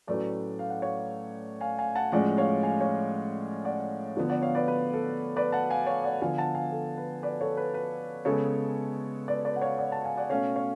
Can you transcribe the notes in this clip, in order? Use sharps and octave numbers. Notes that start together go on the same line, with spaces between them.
A2 F#3 A3 C#4 B4 D5
F5
F#5
C#5 F5
F5 G#5
F5 G#5
F#5 A5
A2 F3 G#3 C#4 D5 F#5
C#5 F5
F5 G#5
C#5 F5
D5 F#5
D3 F3 B3
D5 F#5
C#5 F5
B4 D5
B4
A4
B4 D5
F#5 A5
F5 G#5
C#5 F5
D5 F#5
D3 F3 B3 F5 G#5
F#5 A5
F5 G#5
A4
B4
B4 D5
A4 C#5
B4
B4
C#3 G#3 B3 A4 C#5
B4 D5
B4 D5
F#5
C#5 F5
D5 F#5
F#5 A5
F5 G#5
D5 F#5
B2 A3 C#4 C#5 F5
C#5 F5